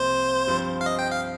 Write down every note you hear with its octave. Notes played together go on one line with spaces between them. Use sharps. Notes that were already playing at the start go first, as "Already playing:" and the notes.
Already playing: C2 C3 F3 A#3 C5
G2 F3 C4
F5
D#5
G5
F5